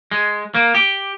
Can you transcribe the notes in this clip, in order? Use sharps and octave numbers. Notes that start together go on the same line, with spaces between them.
G#3
A#3
G4